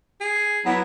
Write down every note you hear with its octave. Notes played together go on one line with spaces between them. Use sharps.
G#4
F#3 B3 E4